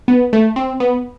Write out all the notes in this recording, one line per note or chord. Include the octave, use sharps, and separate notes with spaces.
B3
A3
C4
B3